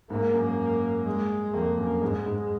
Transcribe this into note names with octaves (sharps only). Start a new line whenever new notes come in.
G#2 A#3
F#2
G#3
F2 A#3
F#2
G#2 G#3
G#2